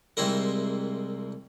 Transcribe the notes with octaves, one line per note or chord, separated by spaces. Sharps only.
C2 G#2 C4 E4 A#4